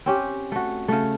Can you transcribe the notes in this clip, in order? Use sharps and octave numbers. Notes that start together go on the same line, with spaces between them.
C4 C#4 G4
A3 F#4
C#3 A3